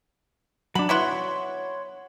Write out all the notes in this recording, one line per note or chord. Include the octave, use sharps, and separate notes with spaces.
F#3 D4 B5
B3 E4 F#4 C#5 C6